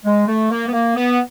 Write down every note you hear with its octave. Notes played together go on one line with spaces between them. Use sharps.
G#3
A3
A#3
B3
A#3
B3